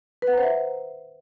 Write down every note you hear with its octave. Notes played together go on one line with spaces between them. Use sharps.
B4
F#5
A#5
C5
E5